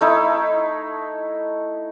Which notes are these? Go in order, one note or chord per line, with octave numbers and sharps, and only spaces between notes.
A3 D#4 E4